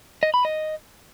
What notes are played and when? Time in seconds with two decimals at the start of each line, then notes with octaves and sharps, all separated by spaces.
0.23 D#5
0.34 B5
0.45 D#5